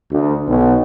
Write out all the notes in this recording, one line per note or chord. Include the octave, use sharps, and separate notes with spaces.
D2
B1